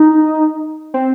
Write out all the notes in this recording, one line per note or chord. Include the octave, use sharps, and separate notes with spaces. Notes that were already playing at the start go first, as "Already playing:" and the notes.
Already playing: D#4
C4